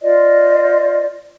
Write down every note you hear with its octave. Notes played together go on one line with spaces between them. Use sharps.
F4 C5 D5 D#5